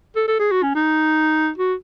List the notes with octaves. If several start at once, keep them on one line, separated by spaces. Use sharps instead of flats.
A4
A4
G#4
F#4
C#4
D#4
F#4